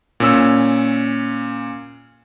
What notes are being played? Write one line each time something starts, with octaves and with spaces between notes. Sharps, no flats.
A#2 C#4 E6